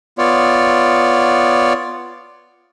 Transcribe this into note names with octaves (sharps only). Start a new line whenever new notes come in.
B3 F4 C#5 D5